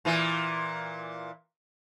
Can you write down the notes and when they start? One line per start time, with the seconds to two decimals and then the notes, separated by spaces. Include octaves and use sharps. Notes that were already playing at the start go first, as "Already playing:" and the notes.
0.05 A#2 E3